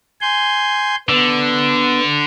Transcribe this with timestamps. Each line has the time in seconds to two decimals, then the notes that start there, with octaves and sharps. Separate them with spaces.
0.21 G#5 C6 G6
1.09 D3 B3